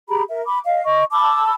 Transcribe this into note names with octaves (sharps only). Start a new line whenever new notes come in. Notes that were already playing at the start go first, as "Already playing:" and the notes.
G4 G#4 A#5 B5
A#4 E5
B5 D6
D#5 F5
D#5 C#6
A5 B5 D6 E6